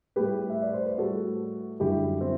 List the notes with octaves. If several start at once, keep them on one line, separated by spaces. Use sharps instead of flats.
A2 G3 G4 B4
E5
D5
C5
B4
A2 G3 F#4 A4
F#2 D3 G3 E4 G4
C4 E4